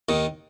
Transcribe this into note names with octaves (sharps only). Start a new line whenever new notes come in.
D#2 D#3